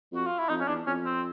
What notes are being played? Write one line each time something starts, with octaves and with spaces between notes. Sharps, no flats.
F2 F#4
F4
E4
F2 D#4
C#4
E2 D4
F2 C#4
C4